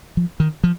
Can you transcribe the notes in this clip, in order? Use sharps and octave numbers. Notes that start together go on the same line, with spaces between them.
F3
D#3
F3